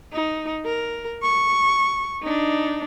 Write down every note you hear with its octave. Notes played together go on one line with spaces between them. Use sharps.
D#4
A#4
C#6
D4 D#4